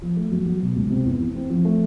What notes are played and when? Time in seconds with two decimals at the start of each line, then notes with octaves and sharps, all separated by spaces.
0.02 F3
0.16 A3
0.31 F#3
0.46 F#3
0.61 B2
0.76 C#2
0.90 C3
1.05 E2
1.20 E3
1.35 C4
1.50 F3
1.65 A3